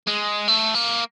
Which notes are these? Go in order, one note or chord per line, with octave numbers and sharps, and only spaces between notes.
G#3
A3
A#3